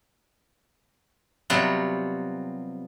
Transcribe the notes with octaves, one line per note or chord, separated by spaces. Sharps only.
C3 F#3 G3 B3 F4